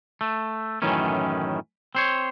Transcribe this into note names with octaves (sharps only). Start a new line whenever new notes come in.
A3
F#2 A2 D#3 E3 C#4
C4 C5 C#5